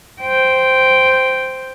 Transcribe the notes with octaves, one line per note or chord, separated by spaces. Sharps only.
C5 G5